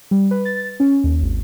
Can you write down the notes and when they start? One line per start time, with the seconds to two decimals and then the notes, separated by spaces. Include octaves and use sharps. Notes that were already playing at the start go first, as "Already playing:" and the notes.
0.11 G3
0.31 B4
0.45 A6
0.80 C#4
1.04 D#2
1.22 G#1